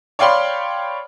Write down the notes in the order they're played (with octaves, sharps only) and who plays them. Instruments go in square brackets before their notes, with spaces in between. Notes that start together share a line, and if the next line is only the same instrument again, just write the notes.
[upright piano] C#5 D5 F5 G5 B5 C6